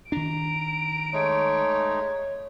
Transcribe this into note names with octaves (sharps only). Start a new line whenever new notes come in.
D#3 D4 A#5 D7
G#3 A3 D#4 C#5